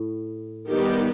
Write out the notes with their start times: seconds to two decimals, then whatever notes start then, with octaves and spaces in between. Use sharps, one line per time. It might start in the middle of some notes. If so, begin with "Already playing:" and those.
Already playing: A2
0.68 D#3 G3 B3 D#4 G4